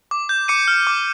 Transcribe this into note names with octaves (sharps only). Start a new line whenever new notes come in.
D6
G6
D6 C#7 D#7
F6
D6